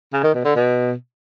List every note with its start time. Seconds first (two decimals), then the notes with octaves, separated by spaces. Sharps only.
0.13 C#3
0.24 D#3
0.34 B2
0.45 D3
0.55 B2